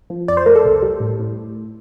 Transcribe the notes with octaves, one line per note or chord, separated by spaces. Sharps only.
F3
F2 D5
C5
A3 A#4
A4
C2
G3
A2
A2